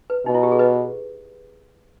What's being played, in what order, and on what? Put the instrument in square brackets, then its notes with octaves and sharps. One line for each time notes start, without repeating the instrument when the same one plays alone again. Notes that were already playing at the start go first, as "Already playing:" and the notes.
[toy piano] B4
[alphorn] B2 [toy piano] D#4
[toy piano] E4
G4
G#4
B4 D#5